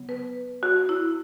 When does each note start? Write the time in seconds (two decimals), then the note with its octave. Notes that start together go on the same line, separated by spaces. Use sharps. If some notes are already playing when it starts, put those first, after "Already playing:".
Already playing: C#3 F#3 B3
0.09 B4
0.63 F#4
0.89 E4